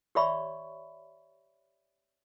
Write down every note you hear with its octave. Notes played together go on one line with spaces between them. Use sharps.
G4 C#5 D5 E5 B5 C#6